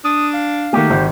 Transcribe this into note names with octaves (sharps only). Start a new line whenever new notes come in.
D4 D#6
F5
D#3 A3 A#3 F#4 G4
G#1 C5